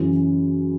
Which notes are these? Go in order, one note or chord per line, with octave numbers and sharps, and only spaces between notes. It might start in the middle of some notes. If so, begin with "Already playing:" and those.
Already playing: F#2 C#3 E3